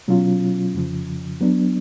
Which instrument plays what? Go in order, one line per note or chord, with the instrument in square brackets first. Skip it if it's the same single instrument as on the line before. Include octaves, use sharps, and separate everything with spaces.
[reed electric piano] B2 F#3 C#4 F4
F2 C#3 F3
F#3 B3 D4